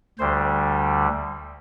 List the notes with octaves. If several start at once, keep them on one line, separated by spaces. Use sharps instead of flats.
D2 D3 G3 C5